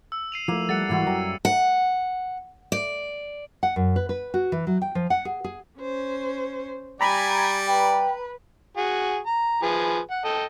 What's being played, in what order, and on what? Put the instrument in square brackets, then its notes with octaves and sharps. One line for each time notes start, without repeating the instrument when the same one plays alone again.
[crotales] E6
C7 D#7 F7
[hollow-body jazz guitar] F3 A3 [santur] A#3 [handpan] E4
[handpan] G3 A4 F#5 [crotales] A6 C#7
[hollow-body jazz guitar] G#2 E3 [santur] A#3 E4 F#4
[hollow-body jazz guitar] F#2 A#5 [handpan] F#3 [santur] G5
[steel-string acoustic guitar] F#5
D5
[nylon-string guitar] F#5
F#2
B4
B4
F#4
E3
F#3
G5
F3
F#5
G#4
G#4
[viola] C#4 C5
[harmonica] G3 D5 [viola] G5 G#5 [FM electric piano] A#5 B5
[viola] B4 [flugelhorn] G5
[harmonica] F#4 G#4
A#5
F3 G#4 B4
F#5
A4 D#5 G5